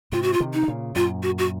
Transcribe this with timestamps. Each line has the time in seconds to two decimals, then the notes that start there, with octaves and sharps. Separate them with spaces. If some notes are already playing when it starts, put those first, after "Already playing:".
0.12 G#2 C3 F4
0.22 F#4
0.33 F4
0.40 C3 D#3
0.54 D#4
0.63 D#3
0.68 A#2 C#3
0.95 F#2 A#2 F4
1.23 F#4
1.38 F#4